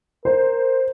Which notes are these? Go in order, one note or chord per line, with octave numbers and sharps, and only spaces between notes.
A#4 C5